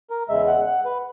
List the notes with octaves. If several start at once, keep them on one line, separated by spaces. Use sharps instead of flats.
A#4
E2 C#3 G#3 E5
F#5
F#5
B4